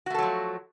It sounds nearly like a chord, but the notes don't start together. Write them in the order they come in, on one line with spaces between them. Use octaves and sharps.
F#4 A3 A4 F#3 F3